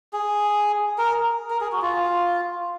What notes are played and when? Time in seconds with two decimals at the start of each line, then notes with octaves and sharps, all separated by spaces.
0.13 G#4
0.98 A#4
1.50 A#4
1.61 G#4
1.72 F#4
1.82 F4